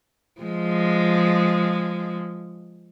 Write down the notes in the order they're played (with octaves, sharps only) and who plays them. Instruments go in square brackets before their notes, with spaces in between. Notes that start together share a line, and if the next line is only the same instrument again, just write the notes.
[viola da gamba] F3 G#3